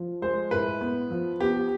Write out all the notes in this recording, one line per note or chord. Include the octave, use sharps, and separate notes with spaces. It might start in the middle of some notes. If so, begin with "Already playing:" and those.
Already playing: F3
G#3 C5
A2 B4
B3
F3
B3 G4